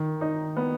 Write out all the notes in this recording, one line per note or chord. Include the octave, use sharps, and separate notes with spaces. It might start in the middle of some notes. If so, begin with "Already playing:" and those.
Already playing: D#3
D#4
B3